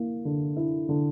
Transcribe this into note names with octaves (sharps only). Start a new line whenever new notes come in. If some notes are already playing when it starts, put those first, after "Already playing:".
Already playing: A#3 E4
D3
E4
D3